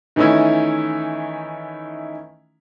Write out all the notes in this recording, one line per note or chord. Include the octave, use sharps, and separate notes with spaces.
D#3 E3 A3 C#4 D#4 E4